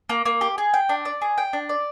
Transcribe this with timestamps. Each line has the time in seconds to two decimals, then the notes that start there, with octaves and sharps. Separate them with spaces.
0.09 A#3
0.25 A#3
0.41 G4
0.58 G#4
0.74 G5
0.89 D4
1.05 D5
1.21 G#4
1.38 G5
1.53 D4
1.69 D5